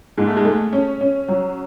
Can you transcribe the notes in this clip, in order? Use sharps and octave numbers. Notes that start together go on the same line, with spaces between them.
G#2 G#3
A3
G#3
A3
C#4
C#4
F#3